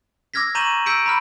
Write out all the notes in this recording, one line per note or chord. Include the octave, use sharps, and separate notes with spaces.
D6 E6 F6 G#6 A#6 B6
A#5 C#6 G6 D#7 E7 F#7
E6 G6 B6 C#7 D7
A#5 B5 F6